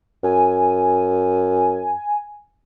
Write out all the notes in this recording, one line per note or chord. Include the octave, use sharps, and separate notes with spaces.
F#2 G#5